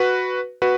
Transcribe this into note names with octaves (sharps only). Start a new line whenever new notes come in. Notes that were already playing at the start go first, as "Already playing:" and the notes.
Already playing: F#4 B4
F#4 B4